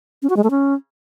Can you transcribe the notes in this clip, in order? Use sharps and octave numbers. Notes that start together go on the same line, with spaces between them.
C#4
F#4
G#3
A3
C#4